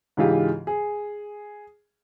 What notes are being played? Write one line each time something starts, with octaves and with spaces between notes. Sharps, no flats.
G#2 C#3 E3 F4 G4
G#4